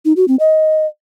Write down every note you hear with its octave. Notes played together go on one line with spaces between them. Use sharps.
D#4
F#4
C4
D#5